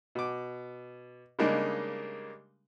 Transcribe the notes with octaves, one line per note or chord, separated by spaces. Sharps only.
B2 D6
C#3 G3 G#3 A#3 D4 D#4